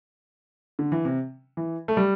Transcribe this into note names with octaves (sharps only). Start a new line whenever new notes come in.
D3
E3
C3
E3
A3
G3